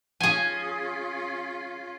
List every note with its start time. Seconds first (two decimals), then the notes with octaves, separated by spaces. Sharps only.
0.20 C#4 F4 G#4 G#5